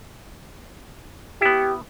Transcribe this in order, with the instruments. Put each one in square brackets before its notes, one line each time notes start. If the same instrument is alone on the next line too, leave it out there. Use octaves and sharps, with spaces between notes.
[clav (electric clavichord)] B3 E4 [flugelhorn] G4